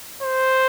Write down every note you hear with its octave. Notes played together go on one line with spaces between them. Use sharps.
C5